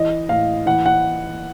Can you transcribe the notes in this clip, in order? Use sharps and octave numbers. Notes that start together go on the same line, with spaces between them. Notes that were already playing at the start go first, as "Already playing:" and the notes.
Already playing: E3 D#5
A2 F5
E3 F#5
F#5